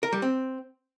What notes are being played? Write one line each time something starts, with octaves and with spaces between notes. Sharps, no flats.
A#4
G3
C4